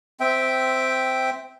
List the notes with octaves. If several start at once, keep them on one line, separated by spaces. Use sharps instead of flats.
C4 E5 G5